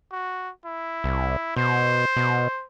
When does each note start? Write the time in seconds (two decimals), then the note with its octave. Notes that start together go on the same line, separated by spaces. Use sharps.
0.12 F#4
0.66 E4
1.04 C2
1.57 B2 C5
2.16 B2